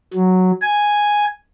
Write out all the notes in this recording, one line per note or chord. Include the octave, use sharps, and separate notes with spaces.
F#3
G#5